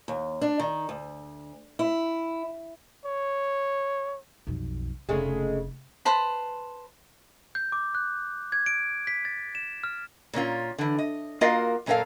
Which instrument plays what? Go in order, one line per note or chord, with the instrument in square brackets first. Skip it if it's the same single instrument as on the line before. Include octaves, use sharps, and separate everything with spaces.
[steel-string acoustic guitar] D#2
D4
D#3
D2
E4
[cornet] C#5
[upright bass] B1 F2
[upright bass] F1 [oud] C#3 G#3 A3
[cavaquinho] B4 C5 A5 B5
[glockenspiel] G6
D6
F#6
G#6
D7
B6
A6
E7
F6
[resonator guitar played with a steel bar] A#2 A#3 C#4 F4
D3 E3
D#5
A#3 F4 F#4 A#4 D#5 F5
F#2 A#2 C#4 A4 A#4 F5